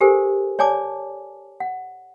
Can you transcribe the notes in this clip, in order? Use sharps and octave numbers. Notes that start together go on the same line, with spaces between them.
G4 A4 A#4 C5 G#5
C#5 D5 G#5 A5 D6
F#5